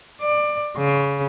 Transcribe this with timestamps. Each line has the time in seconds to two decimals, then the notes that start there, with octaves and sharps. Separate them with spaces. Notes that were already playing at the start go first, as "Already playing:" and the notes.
0.21 D5
0.77 C#3